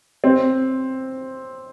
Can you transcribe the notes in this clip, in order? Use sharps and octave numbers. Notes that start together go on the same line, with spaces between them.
C4